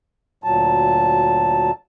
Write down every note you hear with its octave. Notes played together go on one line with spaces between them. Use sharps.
D2 A#2 F#3 A5